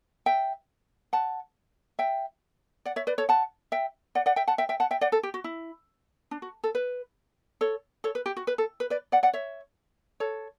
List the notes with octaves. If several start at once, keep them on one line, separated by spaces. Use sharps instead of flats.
E5 G5
F#5 A5
E5 G5
D5 F#5
C#5 E5
B4 D5
A4 C#5
F#5 A5
E5 G5
D5 F#5
D5 F#5
E5 G5
F#5 A5
E5 G5
E5 G5
F#5 A5
E5 G5
D5 F#5
A4
G4
F#4
E4
D4
F#4
A4
B4
A4 C#5
A4 C#5
B4
G4
F#4
B4
A4
B4
B4 D5
D5 F#5
D5 F#5
C#5 E5
A4 C#5